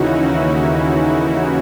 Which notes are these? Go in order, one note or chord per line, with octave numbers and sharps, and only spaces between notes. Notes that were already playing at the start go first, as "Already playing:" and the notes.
Already playing: D#2 C#3 E3 C#4 D#4 E4 F#4
C#4 E4